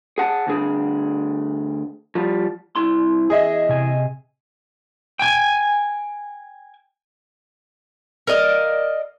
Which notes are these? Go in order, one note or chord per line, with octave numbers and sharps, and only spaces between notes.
G#4 F#5 A5
D2 D3 G#4
F3 G3
C2 E4 C6
E2 G#4 D#5 E5
C3 G#5
G5 G#5
A#4 D5 D#5 F5